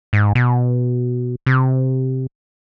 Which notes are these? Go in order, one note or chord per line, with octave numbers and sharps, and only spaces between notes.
G#2
B2
C3